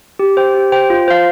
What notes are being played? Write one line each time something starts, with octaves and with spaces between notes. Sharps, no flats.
G4
C5 G5
G4
C5 G5
F4
C5 F5